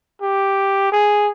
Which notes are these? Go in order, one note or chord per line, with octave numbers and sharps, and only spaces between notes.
G4
G#4